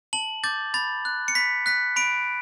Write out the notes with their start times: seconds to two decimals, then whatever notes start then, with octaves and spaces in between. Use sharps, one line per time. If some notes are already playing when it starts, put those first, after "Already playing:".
0.13 A5 F#7
0.44 D6 G6 A6
0.74 B5 A6
1.05 F#6
1.28 C#7
1.35 B5 B6
1.66 F#6 B6
1.96 B5 D7